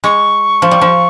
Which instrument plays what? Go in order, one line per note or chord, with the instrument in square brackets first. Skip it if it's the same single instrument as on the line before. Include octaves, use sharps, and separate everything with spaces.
[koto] G#3 [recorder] C#6
[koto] F3
G3
F3